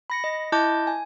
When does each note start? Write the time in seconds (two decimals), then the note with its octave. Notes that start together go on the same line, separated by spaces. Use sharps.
0.10 B5 A#6 C#7
0.24 D#5
0.52 E4 D#5 A5 D6 G6
0.87 G#5